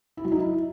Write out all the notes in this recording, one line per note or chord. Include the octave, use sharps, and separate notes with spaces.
E4
F#3
D#4
E4